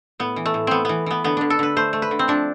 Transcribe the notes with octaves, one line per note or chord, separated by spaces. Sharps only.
A2 B3
E3
A3
A2
A2 B3 C4
E3 B3
E3 B3
D3 B3
D3 D4
A4
D3 B4
A3 C5
A3
B4
D3
C4
F3 D4